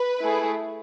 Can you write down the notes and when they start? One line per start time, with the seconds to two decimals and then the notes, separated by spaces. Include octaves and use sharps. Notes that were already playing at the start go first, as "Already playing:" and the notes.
Already playing: B4
0.21 A3 E4 G#4